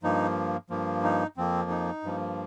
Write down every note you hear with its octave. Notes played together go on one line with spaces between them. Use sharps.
G2 F3 A#3 D#4
G2 F3 A#3
D#4
F2 F3 A#3 C4
D#4
G2 F3 A#3